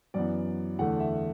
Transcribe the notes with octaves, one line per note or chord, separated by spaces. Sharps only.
F#2 E3 B3 D5
E2 D3 A3 F#5
E5